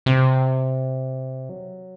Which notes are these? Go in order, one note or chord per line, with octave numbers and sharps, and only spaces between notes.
C3
F#3